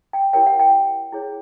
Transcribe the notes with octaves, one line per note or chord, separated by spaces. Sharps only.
G5
E4 G4 A#4 C#5 G5
F#5
G5
E4 G#4 C#5